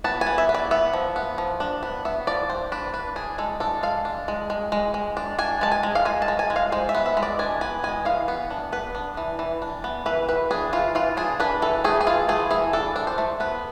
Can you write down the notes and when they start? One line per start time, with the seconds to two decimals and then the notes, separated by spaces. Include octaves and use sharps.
0.04 B3 A5
0.21 G#5
0.27 B3
0.38 E5
0.49 B3
0.54 D5
0.71 B3 E5
0.93 F3
1.16 B3
1.38 F3
1.60 D4
1.83 B3
2.05 B3 E5
2.27 F3 D5
2.50 D4 C5
2.72 D4 B4
2.94 D4 B4
3.16 D4 G#4
3.38 G#3 A4
3.60 D4 A4
3.83 G#3 F5
4.05 D4
4.28 G#3
4.50 G#3
4.72 G#3
4.94 G#3
5.17 D4
5.39 D4 G#5
5.61 G#3 A5
5.72 G#5
5.83 G#3
5.95 F5
6.05 G#3 G#5
6.22 A5
6.28 G#3
6.39 G#5
6.50 G#3
6.56 F5
6.72 G#3 C5
6.89 E5
6.95 B3
7.06 E5
7.17 G#3
7.23 D5
7.39 D4 G#5
7.61 B3 G#5
7.84 G#3 G#5
8.05 E3 F5
8.28 B3
8.50 D4
8.72 B3 B4
8.95 D4
9.17 E3
9.39 E3
9.62 D4
9.84 B3
10.06 E3 B4
10.28 E3 B4
10.51 D4 G#4
10.73 E3 F4
10.95 E3 F4
11.17 D4 G#4
11.40 D4 B4
11.62 E3 A4
11.84 A3 G#4
12.01 G#4
12.07 E3 F4
12.29 A3 G#4
12.51 E3 G#4
12.73 D4 A4
12.96 D4
13.07 C5
13.18 A3
13.40 B3 B4